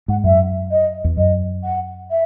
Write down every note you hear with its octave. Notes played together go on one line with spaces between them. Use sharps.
G#2 F#5
F#2 E5
D#5
E2
F#2 D#5
F#5
E5